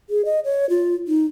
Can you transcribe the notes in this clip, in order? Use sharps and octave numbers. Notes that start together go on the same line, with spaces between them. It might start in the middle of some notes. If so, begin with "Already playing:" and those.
G#4
D#5
C#5
F4
D#4